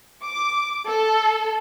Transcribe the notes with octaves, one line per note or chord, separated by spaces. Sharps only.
D6
A4